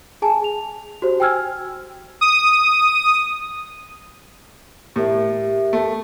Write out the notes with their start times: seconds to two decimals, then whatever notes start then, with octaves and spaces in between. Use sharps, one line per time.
0.22 G#4 G#5 A5
0.44 F7
1.02 F#4 G4 C5
1.20 G5 G#5 E6 F6 G#6
2.21 D#6
4.96 A2 G4 A#4 E5
5.73 A3